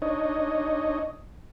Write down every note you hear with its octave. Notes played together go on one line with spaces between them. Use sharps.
D4 D#4 C#5 D#5